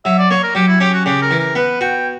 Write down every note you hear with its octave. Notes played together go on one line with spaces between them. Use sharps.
F#3 E5
D5
A#3 C#5
A#4
F#3 G4
E4
C#4 G4
F#4
C#3 G4
A#4
E3
A#4
B3 B4
F#4 G5